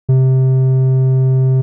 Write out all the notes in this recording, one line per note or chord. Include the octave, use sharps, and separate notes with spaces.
C3